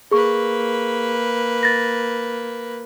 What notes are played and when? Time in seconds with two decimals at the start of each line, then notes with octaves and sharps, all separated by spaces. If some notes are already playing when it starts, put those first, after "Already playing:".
0.11 A#3 G#4 B4 C#6
1.63 A6 A#6